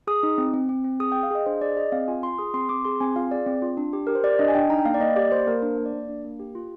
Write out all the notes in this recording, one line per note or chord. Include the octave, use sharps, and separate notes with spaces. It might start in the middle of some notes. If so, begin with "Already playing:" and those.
G#4 D#6
D#4
C4
C4
C4
C4
G#4 D#6
G5
G#4
F5
G#4 D#5
D4 C5
G#4 D5
G#4 D#5
C4 F5
F4 G#5
F4 C6
G#4 D#6
C4 C6
C4 D6
G#4 C6
C4 G#5
F4 F5
G#4 D5
C4
F4
D4
G4
G4 A#4
C5
G4 D5
D4 D#5
G#5
D4 G5
D#4 A#5
G5
A#3 F5
D5
A#3 D#5
G4 D5
A#3 C5
A#3 A#4
D4 C5
A#3
D5
A#3
D4
A#3
G4
F4